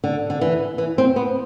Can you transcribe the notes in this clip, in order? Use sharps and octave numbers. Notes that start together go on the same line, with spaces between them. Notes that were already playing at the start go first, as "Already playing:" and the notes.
D3
D3
E3
E3
C4
B3